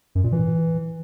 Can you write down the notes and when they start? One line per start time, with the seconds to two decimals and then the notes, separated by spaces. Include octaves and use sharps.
0.15 F#2
0.24 A#2
0.32 E3